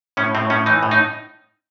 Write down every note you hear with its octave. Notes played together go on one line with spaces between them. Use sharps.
A2 C#4
A2 C4
A2 C#4
E3 D#4
A2
D#4